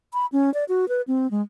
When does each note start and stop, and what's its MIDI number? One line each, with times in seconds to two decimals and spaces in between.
0.13 0.26 83
0.32 0.52 61
0.54 0.64 74
0.69 0.88 66
0.89 1.02 71
1.08 1.30 60
1.31 1.42 56